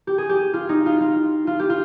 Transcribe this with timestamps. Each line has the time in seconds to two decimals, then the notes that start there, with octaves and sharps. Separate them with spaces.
0.07 G4
0.18 G#4
0.29 G4
0.54 F4
0.69 D#4
0.86 F4
1.00 F4
1.47 F4
1.59 G4
1.70 F4